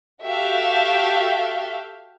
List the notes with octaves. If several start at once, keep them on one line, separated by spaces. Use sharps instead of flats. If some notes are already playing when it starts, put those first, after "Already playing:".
F#4 G4 A4 E5 F5 G5